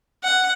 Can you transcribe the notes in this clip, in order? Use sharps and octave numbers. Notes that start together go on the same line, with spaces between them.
F#5